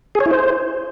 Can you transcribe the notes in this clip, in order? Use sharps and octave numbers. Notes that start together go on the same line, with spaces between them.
G#4
C#5
E4
C5